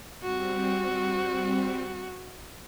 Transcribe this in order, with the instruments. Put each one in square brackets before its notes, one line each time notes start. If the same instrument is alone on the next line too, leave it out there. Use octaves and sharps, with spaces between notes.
[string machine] G3 C4 [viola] F#4